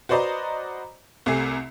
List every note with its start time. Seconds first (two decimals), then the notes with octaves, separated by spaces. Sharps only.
0.09 F#4 B4 C5 D5 D#5 A#5
1.26 C2 C3 A3 G#5 C7